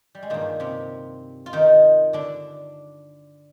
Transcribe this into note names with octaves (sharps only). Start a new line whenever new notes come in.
G3
G#3
G2 A#2 D#3 A#3
C3 C4
F4
D#3 D#4
D3 D4